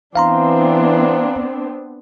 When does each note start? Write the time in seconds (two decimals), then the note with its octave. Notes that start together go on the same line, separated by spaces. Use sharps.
0.16 E3 B3 C4 D4 F5 A#5 C6